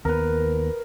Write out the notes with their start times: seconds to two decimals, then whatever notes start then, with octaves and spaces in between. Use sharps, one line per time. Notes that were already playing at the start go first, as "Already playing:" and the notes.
0.05 D#2 B3 A#4 B4